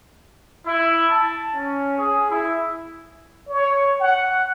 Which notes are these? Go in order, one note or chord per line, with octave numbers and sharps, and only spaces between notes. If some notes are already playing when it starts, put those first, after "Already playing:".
E4
A5
C#4
G#4
E4
C#5
F#5